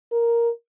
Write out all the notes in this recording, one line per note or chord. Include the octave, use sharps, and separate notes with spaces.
A#4